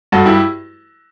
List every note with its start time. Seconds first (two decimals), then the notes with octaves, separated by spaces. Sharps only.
0.12 G2 F#4 A4
0.26 E4 G4